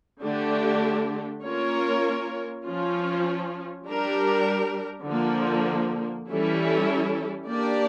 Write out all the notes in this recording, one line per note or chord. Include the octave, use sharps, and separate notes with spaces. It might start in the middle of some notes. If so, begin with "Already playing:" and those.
D3 A3 D4 G4
A#3 C#4 F4 A#4 C#5
F3 C#4 F4
G3 D4 G4 A#4
D3 F3 A#3
E3 G3 C#4 E4 A4
A#3 D4 G4 D5